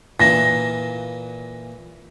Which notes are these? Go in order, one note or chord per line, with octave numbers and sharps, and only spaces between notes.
A#2 E3 A#3 A#6